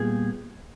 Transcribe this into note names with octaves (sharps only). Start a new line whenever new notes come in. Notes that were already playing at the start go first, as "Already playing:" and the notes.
Already playing: A#2 G3 B3 G#4